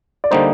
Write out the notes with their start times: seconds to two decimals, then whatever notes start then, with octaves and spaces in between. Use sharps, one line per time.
0.24 D5
0.31 D3 G3 A#3 D#4 C5